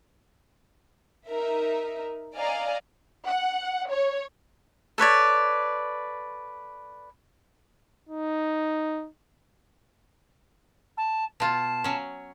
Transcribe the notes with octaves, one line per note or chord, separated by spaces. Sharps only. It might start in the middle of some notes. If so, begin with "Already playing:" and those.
D#4 A#4 E5
D5 D#5 F5 G#5 A#5
F#5
C#5
A4 B4 C#5 D5
D#4
A5
B2 F4 A5
F#3 C#4